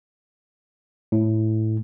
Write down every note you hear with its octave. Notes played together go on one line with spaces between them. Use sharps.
A2